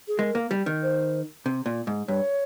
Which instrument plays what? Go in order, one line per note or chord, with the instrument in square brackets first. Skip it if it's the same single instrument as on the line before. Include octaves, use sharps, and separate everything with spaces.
[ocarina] G#4
[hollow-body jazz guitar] G#3 [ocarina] A#4
[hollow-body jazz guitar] A#3
G3
D#3
[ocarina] C5
[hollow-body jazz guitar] C3
A#2
G#2
[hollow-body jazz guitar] G2 [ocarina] C#5